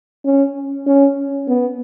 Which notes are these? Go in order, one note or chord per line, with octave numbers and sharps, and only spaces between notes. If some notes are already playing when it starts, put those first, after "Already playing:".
C#4
C#4
B3